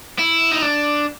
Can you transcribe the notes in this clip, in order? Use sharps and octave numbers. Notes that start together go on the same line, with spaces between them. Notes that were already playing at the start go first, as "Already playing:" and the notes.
E4
D#4
D4